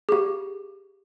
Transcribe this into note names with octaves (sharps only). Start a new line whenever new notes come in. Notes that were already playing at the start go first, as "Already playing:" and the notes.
G4 G#4